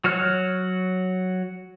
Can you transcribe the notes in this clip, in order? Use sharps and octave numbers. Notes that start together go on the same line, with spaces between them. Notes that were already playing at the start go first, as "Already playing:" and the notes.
F#3 F#4 C#5 F6 F#6